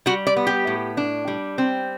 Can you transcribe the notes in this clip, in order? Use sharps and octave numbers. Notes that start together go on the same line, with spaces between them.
G3 F#4
D5
B3
G4
A2
D4
G3
C4